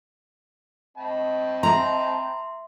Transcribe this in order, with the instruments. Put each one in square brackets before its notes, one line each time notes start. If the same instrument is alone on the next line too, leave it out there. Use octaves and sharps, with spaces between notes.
[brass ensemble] C4 D#5 [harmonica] G5 A5 B5
[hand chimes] E5 C6 [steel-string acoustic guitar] A#5